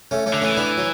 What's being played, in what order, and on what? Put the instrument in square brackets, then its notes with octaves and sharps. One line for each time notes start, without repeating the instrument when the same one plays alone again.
[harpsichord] A3 C#4
A3 C#4
[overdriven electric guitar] D3
[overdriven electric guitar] E3 [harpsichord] A3 C#4
[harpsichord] B3 D4
F#3